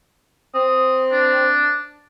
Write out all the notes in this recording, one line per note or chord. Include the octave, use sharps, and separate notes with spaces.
C4 D#6
D4